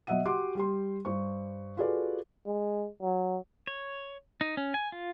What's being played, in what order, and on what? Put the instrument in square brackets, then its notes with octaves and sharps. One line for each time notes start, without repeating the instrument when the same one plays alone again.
[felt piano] B2 F#3 D#5 E5 F#5 D#7
F#4 G4 F#5 C6 D6
G3 G4 C6
G2 C5 C#6
F4 F#4 G#4 A4 B4 D5
[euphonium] G#3
F#3
[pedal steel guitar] C#5
D#4
C#4
G#5
F4